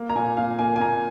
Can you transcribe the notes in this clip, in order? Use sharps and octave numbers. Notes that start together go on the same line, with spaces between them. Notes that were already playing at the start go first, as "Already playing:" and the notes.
Already playing: A#3
A#5
A#2 G#5
A#2 F5
A#3 G#5
G#5
A#2 A#5